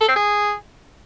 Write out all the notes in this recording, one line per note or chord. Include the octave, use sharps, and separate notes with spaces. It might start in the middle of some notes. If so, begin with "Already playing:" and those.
A4
C4
G#4